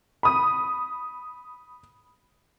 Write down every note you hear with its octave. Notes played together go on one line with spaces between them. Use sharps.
B5 D#6